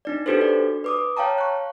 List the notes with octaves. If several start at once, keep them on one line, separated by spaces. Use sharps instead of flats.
D4 D#4 D5
D4 F#4 G4 A4 B4 C5
D5
B4 D6 D#6
C#5 F5 G5 A5 A#5
C#6 F#6